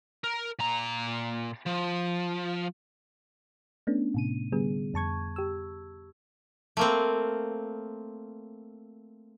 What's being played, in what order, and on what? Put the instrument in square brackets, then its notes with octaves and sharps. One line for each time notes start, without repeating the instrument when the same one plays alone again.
[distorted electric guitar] A#4
A#2 A#5
F3
[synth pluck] A3 B3 C#4 D4
A2 C3 D#7
D3 G3 B3 G#4
F2 A5 C#6 G#6
G4 E6
[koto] A3 A#3 C4